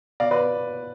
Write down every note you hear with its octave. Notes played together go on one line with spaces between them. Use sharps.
B2 D5 F5
B4 D5